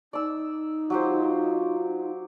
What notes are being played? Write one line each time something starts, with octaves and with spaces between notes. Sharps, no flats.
D#4 D5 E6
F#3 F4 G4 C5